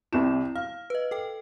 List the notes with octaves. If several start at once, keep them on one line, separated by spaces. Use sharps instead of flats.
C2 C3 E4 E7
F5 F6
B4 D#5
A4 G5